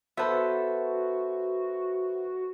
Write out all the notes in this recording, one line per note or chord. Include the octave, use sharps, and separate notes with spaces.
B3 F#4 A4 B4 C5 E5